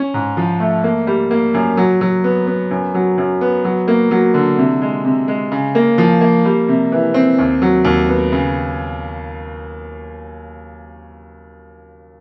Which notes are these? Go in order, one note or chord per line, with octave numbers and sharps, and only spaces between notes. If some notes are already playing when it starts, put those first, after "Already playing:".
Already playing: C#4
G#2
F3
A3
A#3
G3
A#3
F#2
F#3
F#3
B3
B3
F#2
F#3
F#2
B3
F#3
A#3
F#3
D3
C3
G#3
C3
G#3
C#3
A#3
F3
A#3
G3
C3
E3
C4
D#2
F#3
D#2
B3
C#3